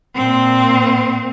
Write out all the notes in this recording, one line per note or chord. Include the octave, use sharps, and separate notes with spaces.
A#2 C4